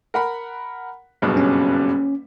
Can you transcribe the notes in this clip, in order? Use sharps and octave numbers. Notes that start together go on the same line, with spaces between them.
A#4 F#5 B5
F#1 G2 B2
C#4